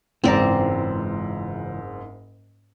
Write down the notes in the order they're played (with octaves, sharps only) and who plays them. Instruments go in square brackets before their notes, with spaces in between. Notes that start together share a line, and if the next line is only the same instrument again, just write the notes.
[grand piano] F#1 G#2 [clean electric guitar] C#2 E3 A#5 [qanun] C4 D5